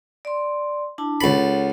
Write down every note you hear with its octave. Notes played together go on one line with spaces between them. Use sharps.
D5 C6
D4 E4 A5
C#2 A4 C#5 F#5 B5